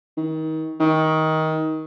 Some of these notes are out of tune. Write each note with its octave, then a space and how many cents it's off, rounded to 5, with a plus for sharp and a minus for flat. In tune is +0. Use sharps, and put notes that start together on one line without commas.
D#3 +30
D#3 +20